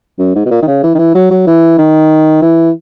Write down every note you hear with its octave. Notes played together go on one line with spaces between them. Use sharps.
F#2
G#2
B2
A#2
D#3
C#3
E3
D#3
E3
F#3
F#3
E3
D#3
E3